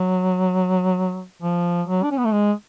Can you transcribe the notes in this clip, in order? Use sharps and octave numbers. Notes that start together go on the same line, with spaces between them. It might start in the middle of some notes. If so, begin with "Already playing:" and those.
Already playing: F#3
F3
F#3
D4
C#4
B3
A3
G#3